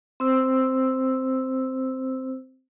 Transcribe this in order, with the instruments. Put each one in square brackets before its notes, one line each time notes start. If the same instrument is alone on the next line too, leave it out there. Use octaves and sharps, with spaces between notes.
[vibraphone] C4 C5 E6